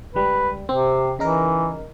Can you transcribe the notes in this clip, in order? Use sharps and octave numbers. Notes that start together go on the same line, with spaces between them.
C#2 G3 B4
C3 C4
C#3 E3 D#4 A#4